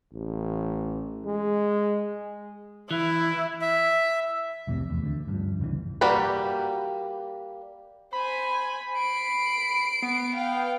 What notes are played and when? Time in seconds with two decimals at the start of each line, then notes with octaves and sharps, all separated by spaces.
0.13 A1
1.25 G#3
2.91 E3 E4
3.62 E5
4.67 C2 F2 A2 C3
4.90 E2
5.02 D2 D3
5.28 G2 F3
5.60 F#1 C2 G2 E3
6.01 G3 A#3 F#4 G4 B4
8.13 C5 G#5 B5
8.98 C7 D7
10.03 B3
10.35 F5 G5